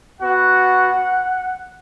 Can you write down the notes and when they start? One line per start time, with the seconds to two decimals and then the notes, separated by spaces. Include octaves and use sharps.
0.20 B3 F#4 F#5